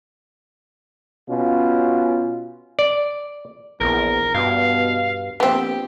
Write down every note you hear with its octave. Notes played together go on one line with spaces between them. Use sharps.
B2 C#4 F4
D5
A#1 E2 A#4
G2 B2 F5
A#1 B3 C4 G4